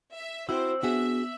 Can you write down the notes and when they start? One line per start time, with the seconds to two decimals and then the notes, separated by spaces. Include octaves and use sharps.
0.15 E5
0.49 C4 E4 F#4 C5 E6
0.83 B3 D4 F#4 G#4 E5